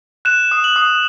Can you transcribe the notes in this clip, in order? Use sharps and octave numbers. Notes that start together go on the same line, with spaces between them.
F#6 E7
D#6
F#7
D#6